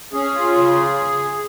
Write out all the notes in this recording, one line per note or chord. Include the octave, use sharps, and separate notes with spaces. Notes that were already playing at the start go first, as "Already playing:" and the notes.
C#4 G#4
F4
C#3